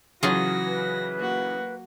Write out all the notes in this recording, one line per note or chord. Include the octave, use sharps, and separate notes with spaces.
C#3 E3 F#3 F4 F#4 G#4 A#6
B4
A#3 F#4